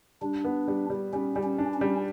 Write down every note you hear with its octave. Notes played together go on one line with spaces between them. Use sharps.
G3 D4
B3
G3
G3
G3 C#4
G3
C#4
D4
C#4
G3